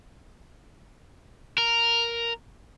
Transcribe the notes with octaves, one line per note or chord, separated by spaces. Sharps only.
A#4